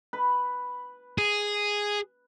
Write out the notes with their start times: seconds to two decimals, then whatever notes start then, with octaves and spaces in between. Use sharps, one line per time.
0.13 B4
1.18 G#4